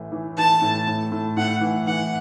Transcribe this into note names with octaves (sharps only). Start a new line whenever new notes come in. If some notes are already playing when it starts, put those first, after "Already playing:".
Already playing: A1 A2 E3 A3
E3
E3 A5
A2
A2
A2
A2 F#5
E3
E3 F#5